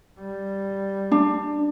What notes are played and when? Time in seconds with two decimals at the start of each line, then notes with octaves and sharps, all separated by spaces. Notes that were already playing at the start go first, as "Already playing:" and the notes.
0.20 G3
1.12 D4